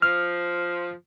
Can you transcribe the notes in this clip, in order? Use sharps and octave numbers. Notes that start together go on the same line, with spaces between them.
F3 F6